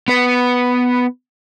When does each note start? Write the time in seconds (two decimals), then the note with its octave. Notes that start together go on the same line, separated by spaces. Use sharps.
0.08 B3 B4